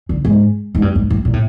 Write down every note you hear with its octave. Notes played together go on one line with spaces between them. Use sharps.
D3
G#2
G#2
G2
G#2
A2
A#2
A2